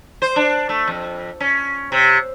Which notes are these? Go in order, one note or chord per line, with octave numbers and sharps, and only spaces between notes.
C5
D4
A3
F2
C#4
C3